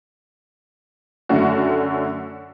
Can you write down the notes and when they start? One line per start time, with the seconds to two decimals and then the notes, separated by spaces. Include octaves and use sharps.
1.29 F#2 D3 F#3 A3 C#4 F#4